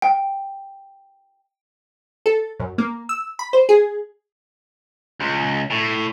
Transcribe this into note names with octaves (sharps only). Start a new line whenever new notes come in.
G5
A4
F#2
A#3
E6
B5
C5
G#4
C#2
A2